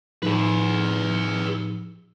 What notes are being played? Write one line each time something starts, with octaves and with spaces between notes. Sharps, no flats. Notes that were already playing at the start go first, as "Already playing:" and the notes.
A2 F3 D#4 G#4 B4